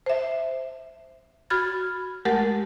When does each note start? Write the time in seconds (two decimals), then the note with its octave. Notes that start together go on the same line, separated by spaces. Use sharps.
0.06 C5 E5
1.50 F#4 B5 F6 G#6 A6
2.25 G#3 A3 G4 A#4 F#5 A6